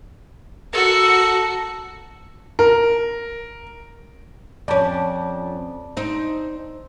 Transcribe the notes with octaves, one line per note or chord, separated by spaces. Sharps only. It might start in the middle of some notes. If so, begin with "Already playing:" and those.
F#4 A4 A#4 C#7
A#4
F2 C#4 D5 A5 D6
C4 D#4